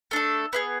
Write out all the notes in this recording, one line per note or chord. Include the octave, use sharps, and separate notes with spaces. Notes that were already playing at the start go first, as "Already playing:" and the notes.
A3 D4 A4
B3 E4 G#4